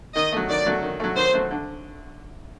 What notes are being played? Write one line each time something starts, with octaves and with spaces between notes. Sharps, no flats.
D#3 D#5
F#3 A3
D#3 D5
F#3 A3
D#3
F#3 A3
D#3 C5
F#3 A3
D3